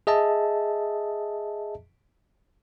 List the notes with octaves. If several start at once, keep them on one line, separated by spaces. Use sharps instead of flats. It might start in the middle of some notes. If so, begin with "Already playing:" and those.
G#4 D#5 E5 A5